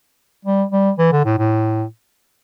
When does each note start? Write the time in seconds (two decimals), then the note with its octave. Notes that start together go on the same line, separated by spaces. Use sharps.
0.45 G3
0.72 G3
0.99 E3
1.12 D3
1.25 A2
1.38 A2